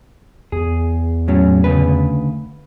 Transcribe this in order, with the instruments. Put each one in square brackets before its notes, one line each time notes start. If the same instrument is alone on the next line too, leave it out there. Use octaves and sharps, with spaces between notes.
[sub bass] E2 [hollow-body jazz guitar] G#4
[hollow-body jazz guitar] A2 F#3 C#4
D2 C#3 B4